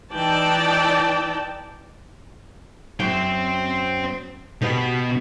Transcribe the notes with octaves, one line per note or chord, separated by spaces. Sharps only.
E3 D#4 D5 G5 A5
F#2 C5 G5
B2 B3 G4 B4